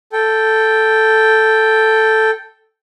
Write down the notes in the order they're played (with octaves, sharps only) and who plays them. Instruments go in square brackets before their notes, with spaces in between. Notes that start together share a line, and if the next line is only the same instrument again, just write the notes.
[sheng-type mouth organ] A4 G5